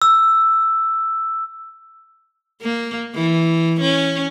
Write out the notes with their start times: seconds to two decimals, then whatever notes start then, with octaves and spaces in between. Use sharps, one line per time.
0.02 E6
2.61 A#3
3.14 E3
3.81 C#4